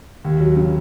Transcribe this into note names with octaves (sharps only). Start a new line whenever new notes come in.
D#2
F#3
C#3